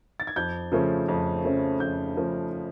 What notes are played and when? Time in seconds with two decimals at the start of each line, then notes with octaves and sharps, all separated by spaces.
0.20 A6
0.27 G#6
0.36 F2 G6
0.72 C#3 F3 A3 C#4
1.08 F2
1.44 C#3 F3 A3 C#4
1.80 F2 G6
2.16 C#3 F3 A3 C#4